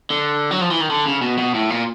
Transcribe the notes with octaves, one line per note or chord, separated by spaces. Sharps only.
D3
F#3
F3
E3
D#3
D3
C#3
B2
B2
A2
A#2